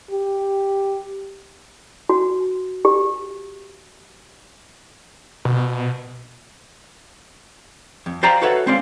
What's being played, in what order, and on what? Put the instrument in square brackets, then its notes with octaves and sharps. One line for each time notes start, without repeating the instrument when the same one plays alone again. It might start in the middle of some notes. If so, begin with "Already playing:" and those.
[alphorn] G4
[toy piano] F#4
G4
[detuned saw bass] B2
[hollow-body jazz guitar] F2
C5 D5 F5 G5 A#5 B5
F#4 A4 B4 C#5 E5 F#5
G#3 C4 C#4 C5 D5 F5